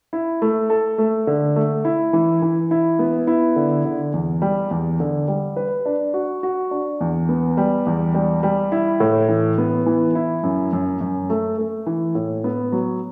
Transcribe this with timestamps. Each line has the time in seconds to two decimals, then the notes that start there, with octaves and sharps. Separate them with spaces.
0.13 E4
0.42 A3
0.70 A4
0.98 A3
1.27 D3
1.56 A3
1.85 E4
2.13 E3
2.42 E3
2.71 E4
2.99 B3
3.27 E4
3.56 D3
3.85 D3
4.13 E2
4.42 G3
4.71 E2
5.00 D3
5.28 G3
5.56 B4
5.85 D4
6.14 F#4
6.43 F#4
6.71 D4
7.01 E2
7.29 B3
7.57 G3
7.86 E2
8.14 G3
8.43 G3
8.72 E4
9.00 A2
9.28 E3
9.58 B3
9.86 E3
10.15 E4
10.43 F#2
10.73 F#2
11.01 F#2
11.30 A3
11.58 A3
11.86 E3
12.15 A2
12.44 B3
12.72 F#3